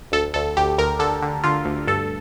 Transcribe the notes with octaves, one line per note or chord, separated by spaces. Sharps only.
D2 A4
D2 A4
D2 G4
D2 A#4
D3 A4
D3
D3 F4
D2
G2 A4